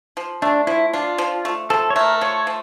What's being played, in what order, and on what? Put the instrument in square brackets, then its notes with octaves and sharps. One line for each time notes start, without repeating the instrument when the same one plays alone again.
[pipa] F3
[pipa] A3 [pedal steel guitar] D4
[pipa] F3 [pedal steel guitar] E4
[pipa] D4 [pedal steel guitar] F4
[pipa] F3
A3
[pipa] F3 [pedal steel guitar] A4
[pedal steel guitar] C#5
[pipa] A3 [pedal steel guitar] A#4
[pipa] F3 [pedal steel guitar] C#5
[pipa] F3